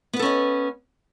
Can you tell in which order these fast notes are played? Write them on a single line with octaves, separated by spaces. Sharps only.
B3 B4 A4 C#4 D#5